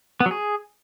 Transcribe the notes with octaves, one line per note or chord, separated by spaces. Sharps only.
B3
F#3
G#4